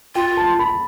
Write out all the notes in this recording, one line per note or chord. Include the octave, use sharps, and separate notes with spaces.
F4 G5
A5
B5